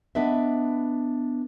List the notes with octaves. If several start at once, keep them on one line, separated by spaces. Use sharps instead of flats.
B3 D4 B4 D#5 E5